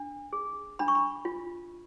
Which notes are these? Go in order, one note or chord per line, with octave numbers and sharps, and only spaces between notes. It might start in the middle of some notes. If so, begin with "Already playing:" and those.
Already playing: D4
G#4
D4 B5
C#6
B5
F4